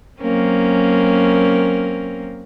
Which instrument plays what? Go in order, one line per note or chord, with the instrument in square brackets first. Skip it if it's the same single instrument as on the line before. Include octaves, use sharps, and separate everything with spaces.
[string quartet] F#3 A#3 C4 C#4 A#4